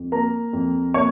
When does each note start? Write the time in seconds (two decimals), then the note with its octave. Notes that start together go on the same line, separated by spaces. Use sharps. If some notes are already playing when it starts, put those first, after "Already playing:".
Already playing: F2
0.12 A#3 A#4 A#5
0.53 F2
0.94 A#3 C#5 C#6